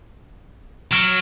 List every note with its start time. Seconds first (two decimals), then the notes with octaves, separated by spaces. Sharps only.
0.92 F#3 F6 D7 E7